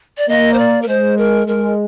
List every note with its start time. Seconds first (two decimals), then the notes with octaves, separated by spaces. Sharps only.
0.17 D5
0.28 A#3 D#5
0.53 C5
0.58 D5
0.82 A#4
0.88 G#3 C5
1.17 A#4
1.47 G#3 A#4